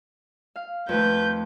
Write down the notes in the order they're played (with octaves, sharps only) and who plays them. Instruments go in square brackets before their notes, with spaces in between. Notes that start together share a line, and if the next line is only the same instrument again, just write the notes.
[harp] F5
[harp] F2 D#3 A3 [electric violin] B4 G6